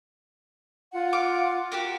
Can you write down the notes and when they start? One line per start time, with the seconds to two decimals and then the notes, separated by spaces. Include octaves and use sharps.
0.92 F4 F#5
1.13 F5 D6
1.72 F#4 G4 A#4